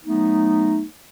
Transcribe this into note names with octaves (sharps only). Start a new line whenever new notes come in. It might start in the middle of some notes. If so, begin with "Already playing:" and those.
F#3 A3 B3 D#4